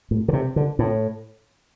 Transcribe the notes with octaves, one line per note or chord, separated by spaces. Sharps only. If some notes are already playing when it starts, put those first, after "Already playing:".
A2
D3
C3
D3
A2